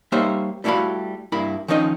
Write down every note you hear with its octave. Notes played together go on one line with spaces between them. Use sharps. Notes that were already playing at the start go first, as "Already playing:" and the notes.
G3 A#3 D#4 C5 C#5 E5
G3 A3 E4 F#4 F5 B5
G2 A#3 E4 B5
D#3 F3 C#4 D#4 D5 D#5